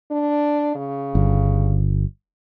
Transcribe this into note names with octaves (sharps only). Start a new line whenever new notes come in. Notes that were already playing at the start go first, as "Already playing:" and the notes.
D4
C#3
G1